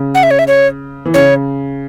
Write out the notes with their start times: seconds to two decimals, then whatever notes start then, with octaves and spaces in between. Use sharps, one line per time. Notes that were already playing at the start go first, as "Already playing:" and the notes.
Already playing: C#3
0.15 F#5
0.23 E5
0.31 C#5
0.39 E5
0.48 C#5
1.05 E3
1.14 C#3 C#5